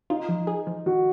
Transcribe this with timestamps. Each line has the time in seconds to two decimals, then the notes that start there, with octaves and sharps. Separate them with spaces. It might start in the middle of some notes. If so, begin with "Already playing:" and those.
0.10 D#4 F4
0.29 F3
0.47 G#4
0.67 F3
0.86 D#3 F#4